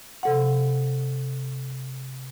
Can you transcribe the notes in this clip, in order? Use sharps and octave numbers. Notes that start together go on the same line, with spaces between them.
C3 A4 F#5